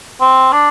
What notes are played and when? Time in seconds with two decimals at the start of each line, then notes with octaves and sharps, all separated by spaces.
0.21 C4
0.53 D4